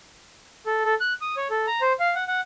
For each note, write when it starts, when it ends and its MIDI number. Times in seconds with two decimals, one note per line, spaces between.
0.66 0.84 69
0.85 0.94 69
1.01 1.13 90
1.21 1.35 87
1.37 1.48 73
1.51 1.66 69
1.67 1.81 82
1.82 1.93 72
2.00 2.14 77
2.15 2.24 78
2.28 2.41 78